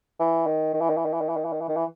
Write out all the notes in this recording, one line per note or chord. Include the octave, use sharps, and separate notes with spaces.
E3
D#3
D#3
E3
D#3
E3
D#3
E3
D#3
E3
D#3
E3
D#3
E3
D#3
E3